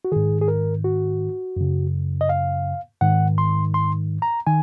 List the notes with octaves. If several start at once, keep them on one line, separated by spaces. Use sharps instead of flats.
F#4
G#2 D#3 G#4
G#4
A#4
F#4
F#2 C#3
D#5
F5
G#2 D#3 F#5
C6
C6
A#5
D#3 G#5